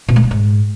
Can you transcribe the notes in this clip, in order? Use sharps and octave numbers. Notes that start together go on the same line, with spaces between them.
B2
G#3
G3
G#2